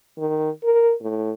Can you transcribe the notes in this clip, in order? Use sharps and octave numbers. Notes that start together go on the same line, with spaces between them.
D#3
A#4
A2